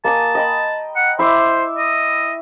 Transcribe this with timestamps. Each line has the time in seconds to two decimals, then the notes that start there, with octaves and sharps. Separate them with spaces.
0.05 A#3 G#5 A5 D#6
0.35 D#5 G5 B5
0.96 F#5
1.19 E4 C5 E5 D6
1.78 D#5